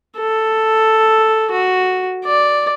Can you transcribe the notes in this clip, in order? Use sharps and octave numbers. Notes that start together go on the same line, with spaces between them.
A4
F#4
D5